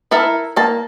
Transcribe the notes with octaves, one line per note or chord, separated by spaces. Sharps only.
E4 A4 A#4 E5
A#3 A5